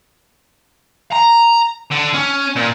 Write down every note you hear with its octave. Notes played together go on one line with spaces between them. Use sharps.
A#5
D3
C#4
A#2